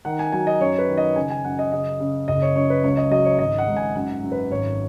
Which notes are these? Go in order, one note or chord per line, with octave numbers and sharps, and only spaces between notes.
D#3 F#5
G#5
F#3 G#5
D#5
F#2 C#5
B4
D#3
D#5
C#3 G#5
G#5
F#2 F#5
D#5
C#3 D#5
C#3
F#1 D#5
C#5
F#2 C#5
B4
C#2 C#5
D#5
F#3 D#5
C#5
G#1 D#5
F#5
G#2
G#5
F#2 F#5
F#2
B4
G#1 C#5